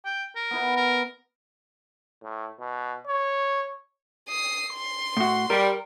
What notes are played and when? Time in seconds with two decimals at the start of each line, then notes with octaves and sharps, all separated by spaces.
0.05 G5
0.36 A#4
0.51 B3 E4 B4
0.77 A#4
2.23 A2
2.59 B2
3.07 C#5
4.29 D#6 C7
4.74 C6
5.17 A2 F#4
5.50 G3 A#4